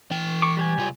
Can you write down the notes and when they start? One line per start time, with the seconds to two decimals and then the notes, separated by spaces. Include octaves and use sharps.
0.11 E3 G5
0.42 C#6 D6
0.57 G3 G4 G#5
0.78 C2 F4